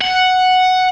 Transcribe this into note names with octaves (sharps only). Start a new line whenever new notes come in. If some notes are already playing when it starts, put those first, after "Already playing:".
F#5